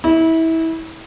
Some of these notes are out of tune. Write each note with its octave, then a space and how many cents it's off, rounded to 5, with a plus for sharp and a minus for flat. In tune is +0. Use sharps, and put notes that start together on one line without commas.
E4 -25